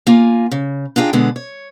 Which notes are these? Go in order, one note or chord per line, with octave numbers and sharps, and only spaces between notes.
A#3 F4 G#5
C#3
D4 D#4 F4 G#4 G5
B2 D3 G#3 B3
C#5